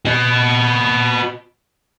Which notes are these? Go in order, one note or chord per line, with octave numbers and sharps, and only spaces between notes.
F#4 D#5